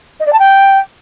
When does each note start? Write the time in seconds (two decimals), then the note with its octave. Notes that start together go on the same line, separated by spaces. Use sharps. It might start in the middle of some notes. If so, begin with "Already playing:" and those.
0.19 D#5
0.26 D5
0.32 A5
0.39 G5